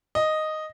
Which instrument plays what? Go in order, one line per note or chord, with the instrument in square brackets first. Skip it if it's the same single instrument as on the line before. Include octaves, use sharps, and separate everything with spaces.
[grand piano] D#5